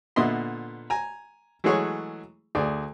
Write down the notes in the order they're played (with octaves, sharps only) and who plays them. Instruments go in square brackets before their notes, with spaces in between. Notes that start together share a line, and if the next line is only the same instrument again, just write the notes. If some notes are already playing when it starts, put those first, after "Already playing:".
[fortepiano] A#2 D3 B3 D#5 E5 C6
G#5 A#5
E3 F#3 G#3 A3 G#4 C#5
D2 G#4 D5